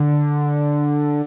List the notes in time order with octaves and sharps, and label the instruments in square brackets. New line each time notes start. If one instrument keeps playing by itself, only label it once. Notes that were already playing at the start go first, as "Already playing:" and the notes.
Already playing: [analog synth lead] D3